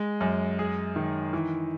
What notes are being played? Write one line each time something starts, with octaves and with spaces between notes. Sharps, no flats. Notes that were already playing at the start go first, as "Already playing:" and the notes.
Already playing: G#3
F#2
G#4
D#3
E3